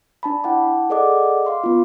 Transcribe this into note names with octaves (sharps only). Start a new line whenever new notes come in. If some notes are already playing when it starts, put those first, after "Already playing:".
D4 A5 B5
E4 F#5 G5 A5 D6
G#4 A4 D5 D#5 F#5 D6
F5 C6 D6
B3 F4